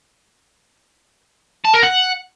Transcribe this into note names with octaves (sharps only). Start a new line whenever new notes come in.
A5
A#4
F#5